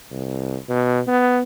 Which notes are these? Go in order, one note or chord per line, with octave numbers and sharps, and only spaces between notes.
C2
B2
B3